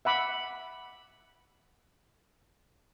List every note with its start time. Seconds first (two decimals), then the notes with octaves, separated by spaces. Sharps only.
0.05 E5 F#5 B5 D6